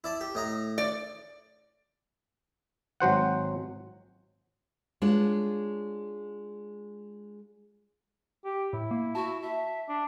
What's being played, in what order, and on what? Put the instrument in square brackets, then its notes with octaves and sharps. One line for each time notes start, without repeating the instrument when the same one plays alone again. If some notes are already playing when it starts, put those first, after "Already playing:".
[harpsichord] E4 D5 A5
G4
A2 D#5 A#5
[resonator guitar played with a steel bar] D5 [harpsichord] C#6
[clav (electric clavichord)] G#1 F#3 C5 F#5
[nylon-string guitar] G#3 D4 F4 C#5
[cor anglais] G4
[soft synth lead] A2 [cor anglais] E4
[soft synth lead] A#3
[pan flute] F#4 [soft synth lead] A5
[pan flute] E5
[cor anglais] D4